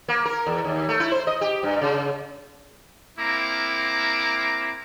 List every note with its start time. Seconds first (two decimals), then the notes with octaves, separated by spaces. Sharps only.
0.08 A#3
0.25 A#4
0.47 E2
0.64 D#2
0.89 A3
1.00 E4
1.12 C5
1.27 D#5
1.41 G4
1.63 G2
1.81 C#3
3.19 A#3 C4 E4 A#5 D6